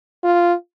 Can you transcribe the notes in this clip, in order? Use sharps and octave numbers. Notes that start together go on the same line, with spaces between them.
F4